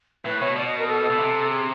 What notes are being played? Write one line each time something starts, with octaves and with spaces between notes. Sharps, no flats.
A2 B4
B2 C#5
B2 D5
D#5
A#4
A4
B2
C3
G#4